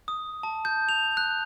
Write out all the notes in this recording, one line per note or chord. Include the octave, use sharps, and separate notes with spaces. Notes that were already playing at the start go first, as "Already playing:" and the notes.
D#6
A5
G6
F7
F#6